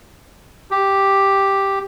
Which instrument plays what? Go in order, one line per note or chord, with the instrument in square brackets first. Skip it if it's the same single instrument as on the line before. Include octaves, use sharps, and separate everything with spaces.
[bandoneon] G4